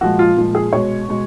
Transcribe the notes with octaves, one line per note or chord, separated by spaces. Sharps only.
A#2 F3 G#3 F#4
F4
A#2 F3 G#3
G#4
B2 G#3 C#5
B2 G#3